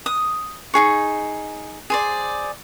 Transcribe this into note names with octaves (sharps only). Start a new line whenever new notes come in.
D#6
D#4 E4 G#4 C#6
G#4 C5 D5